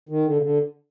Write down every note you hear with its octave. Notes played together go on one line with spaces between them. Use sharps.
D#3
D3
C#3
D3